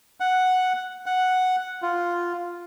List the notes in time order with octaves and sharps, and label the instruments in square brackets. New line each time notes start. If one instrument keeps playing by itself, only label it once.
[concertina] F#5
F#5
F4